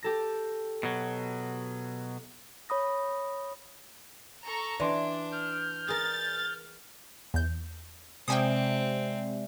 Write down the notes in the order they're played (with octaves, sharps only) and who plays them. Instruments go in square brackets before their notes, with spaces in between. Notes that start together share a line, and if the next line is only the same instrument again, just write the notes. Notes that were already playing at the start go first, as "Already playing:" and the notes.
[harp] G4 A4 A#6
[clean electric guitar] B2 F#3
[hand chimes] C#5 B5 D#6 A#6
[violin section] A4 A#5 C#6
[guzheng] E3 [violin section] D4 [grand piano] D5 C6
[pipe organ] F6 G6
[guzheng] G#4 A#4 [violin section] A6
[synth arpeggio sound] E2 G6
[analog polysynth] C3 [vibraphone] G#3 D5 E5 [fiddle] C4 [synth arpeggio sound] G5 G#5 D#6